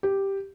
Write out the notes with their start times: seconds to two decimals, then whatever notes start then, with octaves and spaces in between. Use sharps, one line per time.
0.03 G4